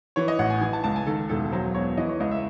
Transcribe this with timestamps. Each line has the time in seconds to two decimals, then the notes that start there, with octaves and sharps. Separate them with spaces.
0.16 E3 C#5
0.28 D#5
0.39 A1 F#5
0.50 G#5
0.61 E3 G#5
0.73 A5
0.84 C#2 A5
0.96 G#5
1.07 D#3 A4
1.29 E1 A4
1.52 F#3 C5
1.74 E2 C#5
1.97 E3 D#5
2.09 C#5
2.20 C#2 D#5
2.31 E5